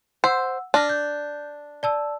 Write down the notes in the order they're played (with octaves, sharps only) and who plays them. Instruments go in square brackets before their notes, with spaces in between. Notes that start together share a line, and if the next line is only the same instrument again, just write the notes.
[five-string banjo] C5 [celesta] F#5 E6
[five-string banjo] D4 [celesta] A5 F6 A#6
[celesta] G6
D5 A5 E6